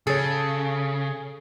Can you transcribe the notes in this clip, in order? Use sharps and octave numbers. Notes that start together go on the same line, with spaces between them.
C#3 G#4 A4 C#5